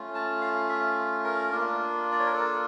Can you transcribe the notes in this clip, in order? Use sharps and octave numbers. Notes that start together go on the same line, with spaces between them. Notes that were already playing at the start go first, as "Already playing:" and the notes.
Already playing: A3 C#4 F4
A5
F5
E5
A#4
A#3 D4 F4
D5
C#5
A#4
A4